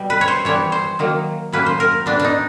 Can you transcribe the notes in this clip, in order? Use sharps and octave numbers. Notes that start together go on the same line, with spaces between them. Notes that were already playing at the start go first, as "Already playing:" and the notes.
Already playing: B2 G3
B4
C#5
C5
E3 G3 B3 C#5
C5
D#3 F#3 A#3
A2 F#3 A#3 C#4 B4
C5
A#4
A2 F#3 B3 D4
D4 D#4